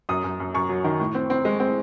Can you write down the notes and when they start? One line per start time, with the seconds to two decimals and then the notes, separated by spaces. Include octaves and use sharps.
0.09 F#2 D#6
0.24 F#2
0.40 F#2
0.54 F#2 C#6
0.69 F#3
0.84 D#3
1.00 A2
1.15 C4
1.30 C4
1.45 G#3
1.60 C4